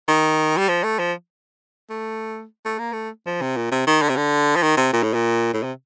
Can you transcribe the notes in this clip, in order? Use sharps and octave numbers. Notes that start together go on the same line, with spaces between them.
D#3
G3
F3
A3
F3
A3
A3
A#3
A3
F3
C3
A#2
C3
D#3
D3
C3
D3
F3
D#3
C3
A#2
A2
A#2
A2
C3